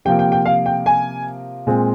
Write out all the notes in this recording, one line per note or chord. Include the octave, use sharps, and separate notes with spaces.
C3 F3 A#3 F4 G5
G5
G5
F5
G5
G#5
A#2 G#3 C4 F4